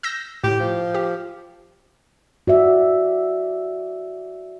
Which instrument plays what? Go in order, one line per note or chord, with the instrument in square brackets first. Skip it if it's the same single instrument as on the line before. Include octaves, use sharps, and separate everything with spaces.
[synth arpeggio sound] E6 G6 A#6
[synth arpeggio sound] A2 [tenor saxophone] G4
[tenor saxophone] F3
[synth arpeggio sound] G4
[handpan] F#4 D5 E5